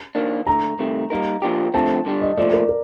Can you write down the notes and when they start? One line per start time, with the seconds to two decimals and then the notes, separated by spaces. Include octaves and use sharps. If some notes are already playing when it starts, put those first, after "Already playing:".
0.15 D#3 A#3 D4
0.47 D2 D3 A3 A#5
0.79 C2 C3 D#3 A3
1.10 G3 A#3 D#4 A#4
1.42 A#2 F3 A#3 D4 G4
1.74 F2 D3 F3 A3 C4 A5
2.05 G2 D3 G3 D4
2.21 D#5
2.37 A#2 F3 A3 D5
2.53 A#4
2.69 A#4